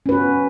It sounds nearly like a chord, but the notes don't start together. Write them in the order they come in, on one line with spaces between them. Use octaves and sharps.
C#4 B4 F#4